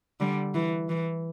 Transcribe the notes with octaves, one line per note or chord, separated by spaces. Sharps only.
D3 G3
E3
E3